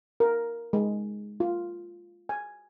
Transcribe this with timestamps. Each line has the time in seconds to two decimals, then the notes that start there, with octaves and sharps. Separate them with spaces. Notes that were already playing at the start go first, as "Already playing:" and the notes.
0.20 A#4
0.73 G#3
1.40 F4
2.29 G#5